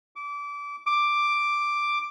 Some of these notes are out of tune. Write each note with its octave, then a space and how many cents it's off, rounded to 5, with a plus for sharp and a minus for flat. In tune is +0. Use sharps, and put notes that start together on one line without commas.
D6 -25
D6 +5